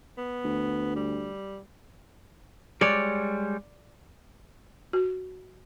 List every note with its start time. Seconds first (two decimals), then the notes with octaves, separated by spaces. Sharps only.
0.18 B3
0.44 D2
0.96 G3
2.81 G3 G#3 C#5 D5
4.93 F#4